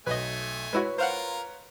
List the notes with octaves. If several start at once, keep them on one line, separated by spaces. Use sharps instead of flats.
B1 A3 B4 D#5 G#5
G#3 E4 F#4 B4 C#5
F4 A#4 C5 F5 F#5